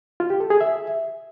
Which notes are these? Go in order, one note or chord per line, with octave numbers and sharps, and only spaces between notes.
F4
G4
A4
G#4
E5